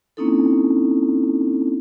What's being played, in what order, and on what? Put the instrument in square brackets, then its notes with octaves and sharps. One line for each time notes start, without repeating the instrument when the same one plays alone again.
[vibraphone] A#3 C4 C#4 D#4 E4 A4